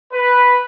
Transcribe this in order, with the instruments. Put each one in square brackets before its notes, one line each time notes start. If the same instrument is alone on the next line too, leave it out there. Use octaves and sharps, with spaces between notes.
[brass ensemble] B4